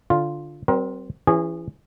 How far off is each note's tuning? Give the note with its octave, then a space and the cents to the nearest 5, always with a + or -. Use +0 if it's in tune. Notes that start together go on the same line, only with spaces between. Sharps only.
D3 +0 F4 +0
G3 -45 C4 +0 A#4 +35
E3 +20 C#4 +0 G#4 -30